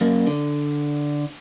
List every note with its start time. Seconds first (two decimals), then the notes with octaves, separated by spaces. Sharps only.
0.01 F#2 A#3
0.27 D3